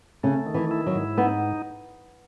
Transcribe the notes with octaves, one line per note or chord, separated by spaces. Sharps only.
C#3 A3
D#3
E3
E4
F#3
G#2
B3 D#4